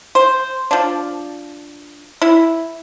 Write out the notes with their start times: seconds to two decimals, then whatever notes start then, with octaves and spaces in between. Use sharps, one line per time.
0.15 C5
0.71 F3 D4
2.22 E4